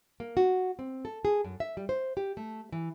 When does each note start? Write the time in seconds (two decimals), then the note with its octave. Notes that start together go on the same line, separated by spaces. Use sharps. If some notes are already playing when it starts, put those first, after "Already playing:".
0.20 A#3
0.37 F#4
0.79 C4
1.05 A4
1.25 G#4
1.44 F#2
1.60 E5
1.77 G3
1.89 C5
2.17 G4
2.37 A3
2.72 E3